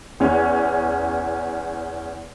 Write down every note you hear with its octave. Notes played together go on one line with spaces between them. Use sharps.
E2 C#4